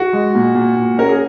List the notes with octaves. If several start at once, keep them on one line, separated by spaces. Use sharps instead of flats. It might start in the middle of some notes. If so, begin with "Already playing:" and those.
Already playing: F#4
G#3
A#2
A#2
A#2
C#4 A#4
G#4